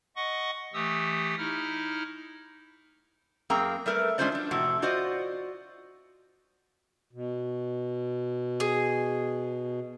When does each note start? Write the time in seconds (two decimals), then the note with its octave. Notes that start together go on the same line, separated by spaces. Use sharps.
0.16 D#5 F#5 C#6
0.74 E3 A3 G4 D#6 E6
1.38 D#4 E4 F6
3.50 F#2 A#3 C4 G#4 G5 A#5
3.86 G3 A3 A#4 B4
4.18 G#3 C#4 D4 F4 C5 D5
4.32 F#3 D4
4.51 F2 A2 C3 F#4
4.82 F4 F#4 C5 D5 D#5
7.13 B2
8.60 G#4